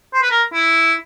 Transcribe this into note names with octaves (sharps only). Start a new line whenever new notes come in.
C5
B4
A#4
E4